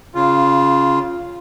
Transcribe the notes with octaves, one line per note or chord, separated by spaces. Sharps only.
C#3 F4